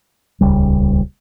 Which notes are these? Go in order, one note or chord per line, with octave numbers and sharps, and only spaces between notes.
D#1 C#2 G3